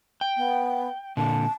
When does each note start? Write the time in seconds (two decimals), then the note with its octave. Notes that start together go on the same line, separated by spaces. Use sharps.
0.21 G5
0.36 B3
1.17 A#2 D3 A5